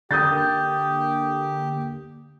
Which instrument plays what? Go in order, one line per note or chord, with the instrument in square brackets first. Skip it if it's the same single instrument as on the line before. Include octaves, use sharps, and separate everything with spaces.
[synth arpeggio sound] D3 A#3 [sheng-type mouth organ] G4 [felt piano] D#6 G6 A6